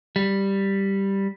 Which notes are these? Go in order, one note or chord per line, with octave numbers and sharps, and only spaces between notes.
G3